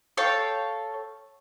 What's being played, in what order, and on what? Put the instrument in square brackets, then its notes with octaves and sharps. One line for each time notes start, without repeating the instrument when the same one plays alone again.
[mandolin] A4 C#5 F5 G5